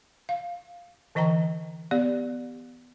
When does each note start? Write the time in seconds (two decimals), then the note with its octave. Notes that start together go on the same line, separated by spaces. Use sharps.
0.29 F5
1.15 D3 E3 D#5 G5 A#5
1.91 B3 G4 D5